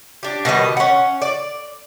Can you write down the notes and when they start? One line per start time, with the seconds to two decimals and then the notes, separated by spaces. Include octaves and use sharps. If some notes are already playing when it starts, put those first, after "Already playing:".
0.23 D4 G4
0.45 B2 D#3 G3 D#5
0.77 C#4 F#5
1.22 D5